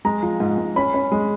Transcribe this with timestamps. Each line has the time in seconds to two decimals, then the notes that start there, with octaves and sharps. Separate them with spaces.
0.05 G#3 A#5
0.23 F3
0.40 G#2
0.58 G#2
0.76 C#4 B5
0.94 C#4
1.12 G#3